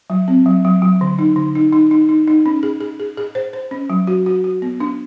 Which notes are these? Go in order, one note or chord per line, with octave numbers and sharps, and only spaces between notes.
F#3
C4
F#3
F#3
F#3
D3
D#4
D3
D#4
D#4
D#4
D#4
D#4
C#4
G#4
G#4
G#4
G#4
C5
C5
C#4
F#3
F#4
F#4
F#4
B3
D4